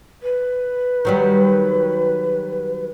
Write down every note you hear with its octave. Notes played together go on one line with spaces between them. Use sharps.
B4
D#3 F#3 G3